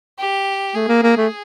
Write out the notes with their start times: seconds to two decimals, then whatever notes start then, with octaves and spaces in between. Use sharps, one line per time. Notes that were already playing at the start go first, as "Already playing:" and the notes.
0.19 G4
0.75 A3 G#4
0.89 A#3
1.03 A#3
1.17 A3